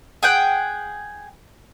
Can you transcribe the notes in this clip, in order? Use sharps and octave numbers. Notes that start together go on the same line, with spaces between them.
G#4 F#5 G5